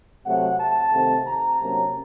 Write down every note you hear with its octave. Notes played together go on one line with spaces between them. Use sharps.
C3 F#3 A3 F#5
A5
C3 D#3 A3 C4
A#5
C3 F#3 A#3 C#4